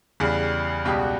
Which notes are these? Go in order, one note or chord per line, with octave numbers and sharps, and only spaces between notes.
E2 C#3 G3
C#2 B2 G3 G4
F#4